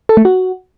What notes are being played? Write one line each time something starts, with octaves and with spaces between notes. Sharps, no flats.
A4
A3
F#4